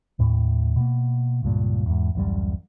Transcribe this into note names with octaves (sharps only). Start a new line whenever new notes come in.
D#2 A2
B2 A#3
C#2 G2 A#2
E2 G#2
D1 A1 F#2 G3